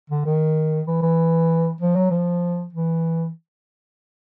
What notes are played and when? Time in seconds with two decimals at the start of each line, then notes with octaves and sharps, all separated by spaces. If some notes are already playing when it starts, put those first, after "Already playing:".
0.10 D3
0.25 D#3
0.87 E3
1.02 E3
1.81 F3
1.96 F#3
2.11 F3
2.73 E3